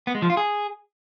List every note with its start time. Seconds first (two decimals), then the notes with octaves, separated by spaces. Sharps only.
0.07 B3
0.15 G#3
0.22 F3
0.30 F4
0.37 G#4